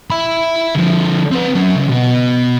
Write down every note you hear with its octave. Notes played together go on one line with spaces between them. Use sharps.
E5 B5
D3 F3
C4 B4
F#3 C#4
C#2
B2 B3